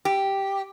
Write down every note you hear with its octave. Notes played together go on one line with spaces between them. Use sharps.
G4